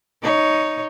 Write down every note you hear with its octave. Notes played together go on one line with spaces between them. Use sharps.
D#4 C#5